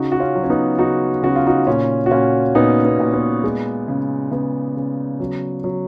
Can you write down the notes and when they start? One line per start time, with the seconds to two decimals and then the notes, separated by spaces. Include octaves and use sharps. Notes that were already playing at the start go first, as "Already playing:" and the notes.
Already playing: C#3 D#4 F#4
0.12 F#4
0.20 C#4 F4
0.35 F#3
0.44 C#4
0.50 B3 D#4
0.78 C#3 D#4 F#4
1.23 C#3 F#4
1.35 F4
1.46 D#4 F#4
1.67 A#2 C#4 F4
2.06 F#4
2.11 A#2 C#4 F4
2.55 A#2 B3 D#4
2.85 B3
3.00 A#2
3.14 B3
3.44 G#3
3.88 C#3
4.31 C#3 B3
4.76 C#3
5.20 F#3
5.64 F#3